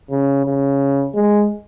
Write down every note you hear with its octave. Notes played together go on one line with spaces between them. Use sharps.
C#3
C#3
G#3